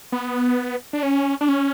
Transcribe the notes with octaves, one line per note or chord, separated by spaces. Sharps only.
B3
D4
C#4
D4
C#4